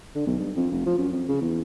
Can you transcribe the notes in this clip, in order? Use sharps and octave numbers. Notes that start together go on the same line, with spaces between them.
D3
B1
G2
F2
F1
F3
F#2
F2
C#3
E2